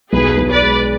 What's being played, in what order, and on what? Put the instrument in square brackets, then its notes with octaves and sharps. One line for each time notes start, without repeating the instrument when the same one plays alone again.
[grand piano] B1 [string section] G#4 B4
[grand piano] B1
[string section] B4 D5
[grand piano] G#3